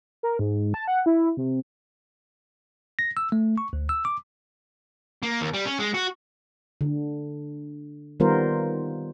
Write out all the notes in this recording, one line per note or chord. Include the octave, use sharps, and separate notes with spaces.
A#4
G#2
A5
F#5
E4
C3
A#6
E6
A3
C#6
D2
E6
D6
A#3
D#2
G3
C#4
G#3
F#4
D3
D#3 G3 B3 F4 A#4 C5